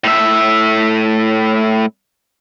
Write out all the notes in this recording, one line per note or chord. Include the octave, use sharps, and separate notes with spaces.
A2 E5